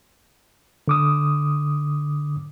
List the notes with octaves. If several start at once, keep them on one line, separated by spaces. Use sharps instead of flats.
D3 D6 D#6